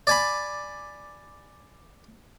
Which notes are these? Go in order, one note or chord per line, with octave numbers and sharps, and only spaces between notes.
D5 G#5 B5